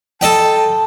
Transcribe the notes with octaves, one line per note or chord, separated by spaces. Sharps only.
A4 D#5 G5 A5